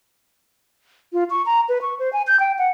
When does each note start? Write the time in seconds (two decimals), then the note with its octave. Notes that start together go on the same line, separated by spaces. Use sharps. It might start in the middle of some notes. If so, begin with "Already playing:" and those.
1.13 F4
1.30 C#6
1.46 A#5
1.69 B4
1.82 C#6
1.99 C5
2.13 G#5
2.27 G6
2.40 G5
2.58 F#5